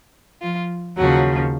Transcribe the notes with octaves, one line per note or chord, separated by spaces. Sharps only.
F3 F4
D#2 C#3 F3 F#3 F#4